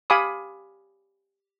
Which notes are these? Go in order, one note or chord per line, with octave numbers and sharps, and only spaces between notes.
G4 F5 G#5 B5 D6 D#6